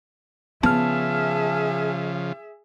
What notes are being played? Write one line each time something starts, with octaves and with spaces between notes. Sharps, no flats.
C#3 F3 B3 G#4 E5 A5 F6